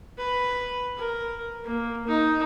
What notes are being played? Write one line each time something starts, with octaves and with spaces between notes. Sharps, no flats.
B4
A#4
A#3
D#4